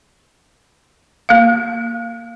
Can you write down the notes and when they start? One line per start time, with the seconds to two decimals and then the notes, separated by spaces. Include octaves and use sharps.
1.29 A#3 F5